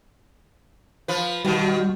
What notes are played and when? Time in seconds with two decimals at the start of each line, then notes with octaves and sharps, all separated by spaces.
1.08 F3 B4
1.45 B2 D#3 G3 F#4